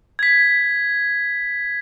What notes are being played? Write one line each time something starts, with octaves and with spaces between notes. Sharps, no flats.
G#6 B6